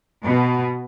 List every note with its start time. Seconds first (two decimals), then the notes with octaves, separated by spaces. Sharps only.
0.24 B2